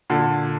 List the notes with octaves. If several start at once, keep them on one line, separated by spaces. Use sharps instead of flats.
A#2 D3